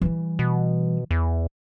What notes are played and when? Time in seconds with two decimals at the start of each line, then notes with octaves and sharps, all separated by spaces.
0.01 E3 G3
0.39 B2
1.11 E2